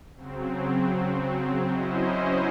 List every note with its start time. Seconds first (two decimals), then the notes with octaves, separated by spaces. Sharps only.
0.16 C#3 F#3 C4
1.69 F#3 C#4 E4 C5 D#5